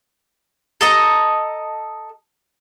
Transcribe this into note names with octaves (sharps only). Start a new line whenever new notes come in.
A4 D#5 A#5